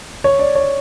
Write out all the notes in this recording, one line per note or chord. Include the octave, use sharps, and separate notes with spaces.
C#5
D5
C#5